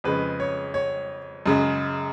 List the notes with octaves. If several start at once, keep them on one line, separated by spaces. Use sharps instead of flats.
F2 C#3 G#3 B4
C#5
C#5
F#2 C#3 G#3